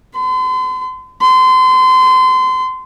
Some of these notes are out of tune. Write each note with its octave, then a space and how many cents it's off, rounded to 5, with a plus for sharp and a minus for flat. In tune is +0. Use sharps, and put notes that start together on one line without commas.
C6 -40
C6 -30